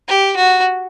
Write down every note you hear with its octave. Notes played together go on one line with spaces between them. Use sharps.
G4
F#4